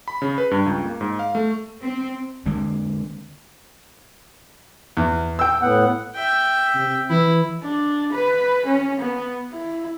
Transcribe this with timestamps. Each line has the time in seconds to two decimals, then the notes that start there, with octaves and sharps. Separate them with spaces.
0.08 B5
0.22 C#3
0.38 B4
0.51 G2
0.66 C#2
0.84 A#3
1.01 G#2
1.19 F5
1.35 A3
1.81 C4
2.46 D3 G#3 A#3 C4
4.97 E2
5.39 G5 E6
5.62 A2 B3 F#5
6.15 E5 G5
6.75 C3
7.10 E3 E4
7.63 D4
8.13 B4
8.66 C#4
8.99 B3
9.52 E4